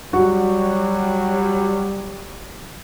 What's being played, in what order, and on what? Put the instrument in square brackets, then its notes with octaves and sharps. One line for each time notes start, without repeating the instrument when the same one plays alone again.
[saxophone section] F#3 G3 [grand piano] F#4